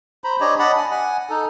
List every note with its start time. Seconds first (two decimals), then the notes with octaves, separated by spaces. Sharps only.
0.24 C5 A#5 B5
0.40 D4 G4 C#5 D#5
0.59 D#5 F#5 A5 B5
0.78 G#5
0.91 F#5 G#5
1.30 D#4 A4